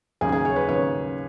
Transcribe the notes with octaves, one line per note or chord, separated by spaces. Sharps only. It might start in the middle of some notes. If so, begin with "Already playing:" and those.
D#2 C#3 F#3 G#4
G#4
C#5
B4
D#2 C#3 F#3 C#5